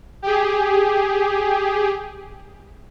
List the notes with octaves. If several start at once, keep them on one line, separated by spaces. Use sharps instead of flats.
G4 G#4